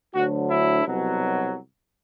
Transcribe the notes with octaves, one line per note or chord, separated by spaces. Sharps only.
D2 D3 F#3 F#4
E4
C2 B2 F#3